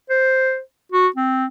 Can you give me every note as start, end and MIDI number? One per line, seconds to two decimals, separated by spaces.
0.10 0.60 72
0.92 1.08 66
1.16 1.46 60